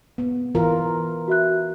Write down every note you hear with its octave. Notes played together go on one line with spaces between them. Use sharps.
B3
E3 F4 A#4
F#4 E5 F#6